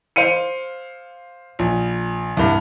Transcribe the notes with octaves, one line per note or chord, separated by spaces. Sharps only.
C5 F5 C#7 D#7
A#1
C2 G2